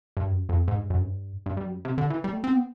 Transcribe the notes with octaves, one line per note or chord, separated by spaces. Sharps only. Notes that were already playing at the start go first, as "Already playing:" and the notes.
G2
F#2
F2
G#2
G2
F#2
G2
G2
G2
F#2
C3
D3
E3
G3
A3
C4
B3